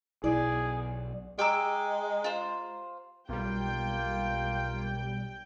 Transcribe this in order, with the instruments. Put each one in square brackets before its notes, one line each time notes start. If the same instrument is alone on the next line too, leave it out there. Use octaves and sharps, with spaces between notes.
[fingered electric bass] B1 [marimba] E4 [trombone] G#4 [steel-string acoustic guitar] D5
[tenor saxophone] G#3 [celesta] G4 A#5 [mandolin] G5 D6 E6
[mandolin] F4 C5
[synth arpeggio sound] B1 G3 [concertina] A#3 F4 [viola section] G5